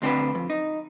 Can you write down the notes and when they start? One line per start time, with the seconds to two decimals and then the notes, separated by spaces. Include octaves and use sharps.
0.02 D2 C4 D4 B4
0.35 F2
0.50 D#4